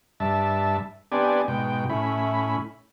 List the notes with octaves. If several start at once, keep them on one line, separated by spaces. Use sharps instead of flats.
G2 E5 A5
B3 C4 D4 G4 D5 G#5
G#2 B2 G5
A2 C#4 E4 B5